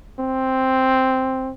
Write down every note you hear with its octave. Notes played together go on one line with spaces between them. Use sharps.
C4